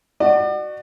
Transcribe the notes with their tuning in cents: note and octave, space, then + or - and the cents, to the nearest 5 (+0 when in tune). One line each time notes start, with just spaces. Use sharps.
F#4 +10 D5 +35